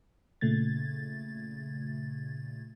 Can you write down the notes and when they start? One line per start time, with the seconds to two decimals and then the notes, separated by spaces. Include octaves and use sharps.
0.41 A#2 C#3 A3 G#6 A6